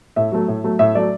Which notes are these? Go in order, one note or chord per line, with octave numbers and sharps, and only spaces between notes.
A2 E5
F#3 A3
A2
F#3 A3
A2 E5
F#3 A3 D5